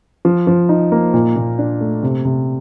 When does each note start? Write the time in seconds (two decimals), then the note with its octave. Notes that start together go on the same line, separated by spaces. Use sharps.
0.25 F3
0.47 F3
0.69 D#4
0.92 A#3
1.14 A#2
1.36 A#2
1.58 D4
1.81 A3
2.03 C3
2.25 C3